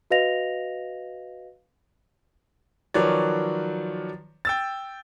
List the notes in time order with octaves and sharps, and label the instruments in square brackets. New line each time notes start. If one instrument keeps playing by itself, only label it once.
[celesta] F#4 B4 D#5 F5 A#6 F7
[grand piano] D#3 F3 F#3 B4 C#5 D5
G5 E6 A6